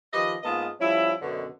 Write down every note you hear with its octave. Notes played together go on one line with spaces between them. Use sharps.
D#3 F3 G4 B4 D#5
G#2 A#3 B3 F4 D#5 A5
F3 G3 C#4 E4
F#2 B2 D3